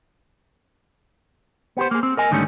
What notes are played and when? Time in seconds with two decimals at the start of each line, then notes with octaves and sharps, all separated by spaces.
1.77 B3 G4 C5
1.91 A#3 G#4
2.03 C4
2.17 A#4 D#5 G#5
2.31 G#2 D3 D#3 G3 A3 C#4